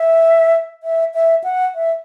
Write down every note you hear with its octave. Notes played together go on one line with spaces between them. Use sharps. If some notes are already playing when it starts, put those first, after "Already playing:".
Already playing: E5
E5
E5
F#5
E5